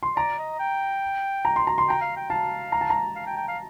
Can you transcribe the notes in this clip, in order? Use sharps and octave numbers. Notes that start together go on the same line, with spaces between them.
C6
D5 A#5
D#5
G5
A#5
C6
A#5
C6
G5 A#5
F5
G5
F5 A5
A#5
A5
A#5
F5
G5
G5
F5